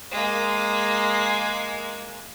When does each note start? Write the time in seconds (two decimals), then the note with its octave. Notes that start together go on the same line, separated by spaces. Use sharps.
0.12 G#3 A#3